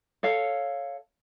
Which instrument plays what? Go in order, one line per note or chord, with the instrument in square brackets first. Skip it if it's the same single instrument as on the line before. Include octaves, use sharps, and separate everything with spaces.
[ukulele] A4 C#5 F5